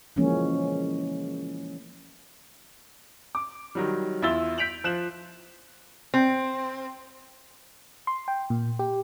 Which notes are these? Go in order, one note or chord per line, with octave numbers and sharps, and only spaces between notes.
E3 F3 G#3 A#3 C#4
D6
D#3 F#3 G3
E2 E4 F4 E6 A6 G7
G6 B6 D7 F7 F#7
F3 F#6 E7 F#7
C4
C6
G5
A#2
G4